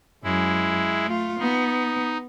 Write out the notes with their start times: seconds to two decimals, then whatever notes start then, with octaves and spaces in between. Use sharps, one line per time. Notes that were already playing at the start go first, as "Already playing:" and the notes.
0.24 F#2 G#3 E4
1.05 A3 F4
1.39 B3 D#4